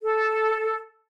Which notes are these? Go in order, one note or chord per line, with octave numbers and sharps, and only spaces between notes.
A4